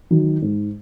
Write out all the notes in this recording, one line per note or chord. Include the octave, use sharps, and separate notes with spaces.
D#3 F#3
G#2